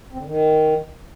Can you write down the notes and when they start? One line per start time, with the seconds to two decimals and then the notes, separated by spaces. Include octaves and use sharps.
0.13 C4
0.19 D3
0.25 D#3